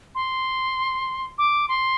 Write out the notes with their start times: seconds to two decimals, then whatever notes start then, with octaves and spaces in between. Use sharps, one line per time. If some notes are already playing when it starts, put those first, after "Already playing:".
0.15 C6
1.38 D6
1.69 C6